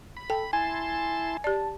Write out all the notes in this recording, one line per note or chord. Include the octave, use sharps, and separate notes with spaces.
B5
A4 G5
E4 G#5 A5 C6
G4 D5 A5